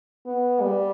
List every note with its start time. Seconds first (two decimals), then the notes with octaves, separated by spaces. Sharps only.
0.26 B3
0.61 G3